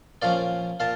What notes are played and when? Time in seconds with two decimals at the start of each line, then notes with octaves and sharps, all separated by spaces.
0.22 A#2 F3 C#4 D5 F5
0.80 A#2 F5 A5